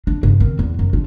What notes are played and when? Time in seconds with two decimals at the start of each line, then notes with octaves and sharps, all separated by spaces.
0.07 D4
0.23 G2 C3
0.40 D#3 C4
0.59 E2
0.79 F#2
0.93 D4 F4